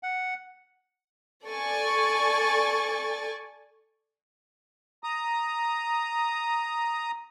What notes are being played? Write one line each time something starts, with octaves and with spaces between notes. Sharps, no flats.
F#5
A4 D5 G#5 C#6 A6
A#5 D#6